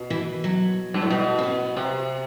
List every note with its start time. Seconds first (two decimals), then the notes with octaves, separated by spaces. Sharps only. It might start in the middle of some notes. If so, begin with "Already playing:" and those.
Already playing: B2
0.10 E3
0.44 F#3
0.94 G2
1.02 A2
1.10 B2 G3
1.39 C4
1.43 B3
1.77 C3